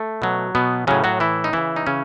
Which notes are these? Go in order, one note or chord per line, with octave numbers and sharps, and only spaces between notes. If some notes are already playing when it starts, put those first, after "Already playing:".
Already playing: A3
B2 F#3
B2 B3
A2 C#3 F#3 C#4
F#3 F#4
E3 E4
D#4
C#3 E3 E4
D#4
C#3 C#4